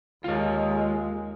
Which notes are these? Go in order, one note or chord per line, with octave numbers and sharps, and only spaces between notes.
D#2 G#3 F4 C#5